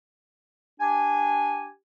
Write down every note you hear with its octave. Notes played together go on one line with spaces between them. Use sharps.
D4 G4 G#5